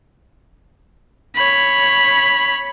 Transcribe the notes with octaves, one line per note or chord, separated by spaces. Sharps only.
C#5 B5